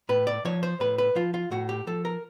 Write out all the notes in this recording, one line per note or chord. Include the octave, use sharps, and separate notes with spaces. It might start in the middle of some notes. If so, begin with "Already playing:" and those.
A2 B4
D5
F3 C#5
C5
A2 B4
B4
F3 F4
F4
A2 F#4
G4
F3 A4
A#4